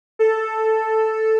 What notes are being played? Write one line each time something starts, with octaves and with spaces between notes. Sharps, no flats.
A4